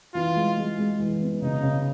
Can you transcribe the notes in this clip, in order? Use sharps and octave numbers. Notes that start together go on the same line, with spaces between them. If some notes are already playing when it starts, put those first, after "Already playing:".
E3 F4
G#3
G#3
G#3
E3
B3
C#3 D#4
C#3